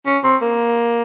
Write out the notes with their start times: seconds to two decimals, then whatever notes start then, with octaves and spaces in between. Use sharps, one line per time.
0.06 C#4
0.24 C4
0.42 A#3